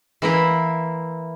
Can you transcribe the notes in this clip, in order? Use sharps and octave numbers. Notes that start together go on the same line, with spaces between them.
E3 A#3 E4